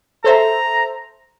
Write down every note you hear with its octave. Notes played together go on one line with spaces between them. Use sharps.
A4 C5 E5 A#5